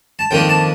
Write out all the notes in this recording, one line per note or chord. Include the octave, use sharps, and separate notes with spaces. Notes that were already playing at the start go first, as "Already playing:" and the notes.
A5
F2 D#3 A#3 D4 G5
A5